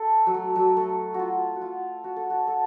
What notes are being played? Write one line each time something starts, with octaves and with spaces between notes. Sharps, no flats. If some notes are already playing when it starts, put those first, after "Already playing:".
Already playing: A4
F#3
A3
F#3
A3
F#4
F4
F#4
F4
F#4
A4
F#4
A4